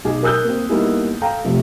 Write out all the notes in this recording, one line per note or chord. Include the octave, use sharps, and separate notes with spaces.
B1 G#4 D6
A#4 G#5 D#6 E6 F#6 G6
A#3 C4
G3 A#3 B3 D#4 E4 G#4
A4 F5 G5 A#5
C3 F3 A3